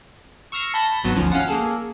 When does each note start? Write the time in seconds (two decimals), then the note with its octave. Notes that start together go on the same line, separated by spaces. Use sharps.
0.52 C#6 E6 F6 A#6 C7 C#7
0.74 A5 B5 G6 A#6
1.04 G#1 F#3 B3 A5
1.15 D2 F3 C#4
1.32 C#4 F5 F#5
1.48 A#3 G#4 A4